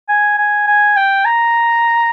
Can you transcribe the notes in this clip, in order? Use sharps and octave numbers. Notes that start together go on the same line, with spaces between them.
G#5
G#5
G#5
G5
A#5